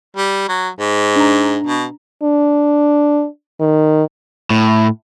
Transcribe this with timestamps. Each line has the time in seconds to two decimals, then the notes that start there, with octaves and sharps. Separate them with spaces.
0.16 G3
0.48 F#3
0.79 G#2
1.16 D4 A#5
1.66 B2
2.23 D4
3.61 D#3
4.50 A2